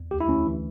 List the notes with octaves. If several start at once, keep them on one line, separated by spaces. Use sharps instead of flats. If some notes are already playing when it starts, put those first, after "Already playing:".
Already playing: E2
D2 G4
E4
D2 C#4
E3